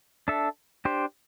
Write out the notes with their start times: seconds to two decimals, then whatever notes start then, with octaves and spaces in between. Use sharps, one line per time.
0.28 D4 A4 E5
0.85 D4 G4 C5